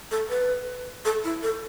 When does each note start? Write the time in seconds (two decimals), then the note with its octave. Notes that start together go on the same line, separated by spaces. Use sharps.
0.11 A4
0.29 B4
1.05 A4
1.24 E4
1.43 A4